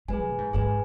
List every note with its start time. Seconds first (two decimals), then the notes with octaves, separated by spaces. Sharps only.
0.08 G#3 G#4 B4 G#5
0.24 B2
0.38 G#2
0.53 G#2 G#4 B4 G#5